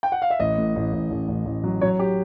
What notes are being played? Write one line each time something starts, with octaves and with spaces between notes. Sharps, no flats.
G5
F#5
F5
E5
A1 D#5
A2
A1
A1
A1
A1
A1
F#3
F#3 C#5
G4